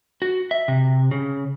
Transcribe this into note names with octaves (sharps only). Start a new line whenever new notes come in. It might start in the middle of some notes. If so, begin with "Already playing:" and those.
F#4
E5
C3
C#3